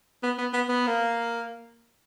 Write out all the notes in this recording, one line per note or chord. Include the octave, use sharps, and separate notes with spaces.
B3
B3
B3
B3
A#3